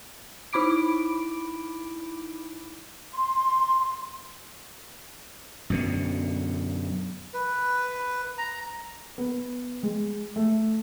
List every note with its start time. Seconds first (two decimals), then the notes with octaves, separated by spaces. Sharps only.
0.53 D#4 E4 B5 D6 D7
3.14 C6
5.70 F#2 B2 D3
7.34 B4
8.38 A#5
9.18 B3
9.83 G#3
10.36 A3